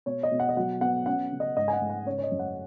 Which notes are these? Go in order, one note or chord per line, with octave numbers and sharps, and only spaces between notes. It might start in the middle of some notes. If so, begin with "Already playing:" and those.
B2 C#5
D#5
B2
F#5
D#5
F#3 F#5
B3 F#5
C#4 F#5
C#3
D#5
G#2 D#5
G#5
F#5
G#2
F#5
C#3 C#5
C#5
D#5
F#2
F#5